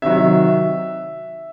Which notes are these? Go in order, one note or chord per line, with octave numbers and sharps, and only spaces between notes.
C3 D#3 F#3 E5